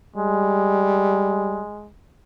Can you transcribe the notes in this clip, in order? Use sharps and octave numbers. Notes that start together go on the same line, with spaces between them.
G3 G#3